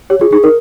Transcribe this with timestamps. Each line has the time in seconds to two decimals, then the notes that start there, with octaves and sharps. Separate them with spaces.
0.10 G4 C#5
0.21 F4 G#4
0.32 D#4 G#4
0.43 D#4 A#4